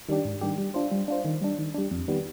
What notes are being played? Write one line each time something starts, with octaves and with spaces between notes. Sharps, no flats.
D#3 G3 D4 G4
G#2
D#3 G3 D4 G4
G3
D4 F4 C5
G3
D4 F4 C5
D#3
G3 D4
D#3
G3 D4
F2
D#3 G3 B3